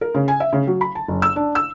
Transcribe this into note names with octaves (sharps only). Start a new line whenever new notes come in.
A#4
C#3
G#5
E5
C#3
F#3
B5
A5
F#1
E6
D4
E6